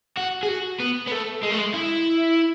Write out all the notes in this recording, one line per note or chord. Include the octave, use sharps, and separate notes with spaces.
F#4
G#4
F#4
B3
B3
A3
G#3
A3
G#3
E4